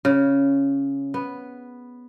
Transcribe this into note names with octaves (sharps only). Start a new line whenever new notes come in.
C#3
B3